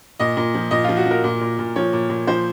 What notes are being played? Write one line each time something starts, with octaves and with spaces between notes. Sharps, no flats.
A#2 D#5
A#2
F3
A#2 D#5
F4
F3
F#4
F3
A#4
A#2
A#2
A#2
F3 C#5
A#2
A#2
F3 C5